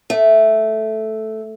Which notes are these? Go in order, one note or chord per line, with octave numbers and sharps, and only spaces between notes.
A3